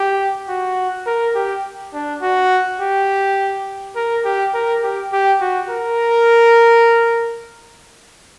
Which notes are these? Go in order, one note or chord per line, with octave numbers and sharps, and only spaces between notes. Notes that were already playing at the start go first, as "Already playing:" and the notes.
Already playing: G4
F#4
A#4
G4
D4
F#4
G4
A#4
G4
A#4
G4
G4
F#4
A#4